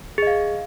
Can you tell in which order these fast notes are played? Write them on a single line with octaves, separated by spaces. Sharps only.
G#4 D#5 F5